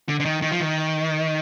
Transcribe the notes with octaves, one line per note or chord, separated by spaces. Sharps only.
D3
D3
D#3
D#3
F3
D#3